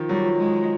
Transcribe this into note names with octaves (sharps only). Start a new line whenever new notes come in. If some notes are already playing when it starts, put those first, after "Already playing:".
Already playing: D#3 F3
F#3 G3
F3
G#3